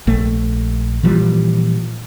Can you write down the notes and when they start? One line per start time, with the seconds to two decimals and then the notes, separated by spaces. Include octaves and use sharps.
0.07 A#1 A3
1.03 A#2 E3 F3 G3